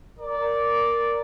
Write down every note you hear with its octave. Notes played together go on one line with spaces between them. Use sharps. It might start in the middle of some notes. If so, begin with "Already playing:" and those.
A#4 D5